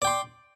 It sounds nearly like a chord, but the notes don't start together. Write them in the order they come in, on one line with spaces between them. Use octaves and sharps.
D5 G5 C6